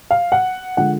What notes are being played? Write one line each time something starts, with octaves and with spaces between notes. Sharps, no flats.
F5
F#5
D3 F3 G#3 F#5